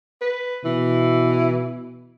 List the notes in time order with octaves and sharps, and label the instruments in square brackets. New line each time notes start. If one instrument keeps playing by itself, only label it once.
[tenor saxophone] B4
[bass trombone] B2 [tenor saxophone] E3